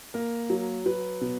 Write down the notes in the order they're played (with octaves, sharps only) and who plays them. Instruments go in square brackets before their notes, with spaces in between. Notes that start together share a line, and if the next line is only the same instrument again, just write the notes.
[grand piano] A#3 A#4
F#3
F#3 B4
B2